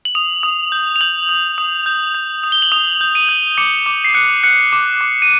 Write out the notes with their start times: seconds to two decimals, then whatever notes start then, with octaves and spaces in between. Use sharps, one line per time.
0.05 F#7
0.15 D#6 F7
0.43 D#6
0.72 G6
0.96 F7
1.01 G6 F#7
1.29 D#6
1.58 D#6
1.86 G6
2.14 G6
2.44 D#6
2.52 G7
2.62 F#7
2.72 D#6 F7
3.01 G6
3.15 D#7
3.29 G6
3.58 D6 C#7
3.86 D6
4.05 C7
4.14 F#6 C#7
4.43 F#6 C#7
4.73 D6
5.01 D6
5.22 D#7